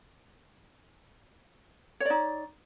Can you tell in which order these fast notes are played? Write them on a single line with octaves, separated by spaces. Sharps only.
C#5 D5 D#4